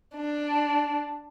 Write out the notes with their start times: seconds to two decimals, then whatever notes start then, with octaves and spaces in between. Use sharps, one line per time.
0.16 D4